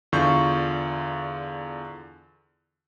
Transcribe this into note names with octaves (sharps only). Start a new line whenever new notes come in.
E2 D3 F4 C#6 G6